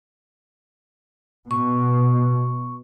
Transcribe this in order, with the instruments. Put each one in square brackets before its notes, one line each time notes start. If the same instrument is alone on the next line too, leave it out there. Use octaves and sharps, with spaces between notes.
[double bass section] B2 [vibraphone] C#6